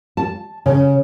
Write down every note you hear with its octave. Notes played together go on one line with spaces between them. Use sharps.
A5
C#3